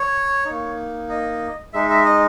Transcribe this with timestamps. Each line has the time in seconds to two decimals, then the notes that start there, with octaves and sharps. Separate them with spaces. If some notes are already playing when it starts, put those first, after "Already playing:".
Already playing: C#5
0.46 A#3 D#4
1.09 D#5
1.73 G#3 D#4 E5
1.90 E5
2.05 D#5